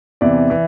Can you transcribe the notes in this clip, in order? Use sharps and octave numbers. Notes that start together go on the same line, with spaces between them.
E2 C3 E3 D5
E3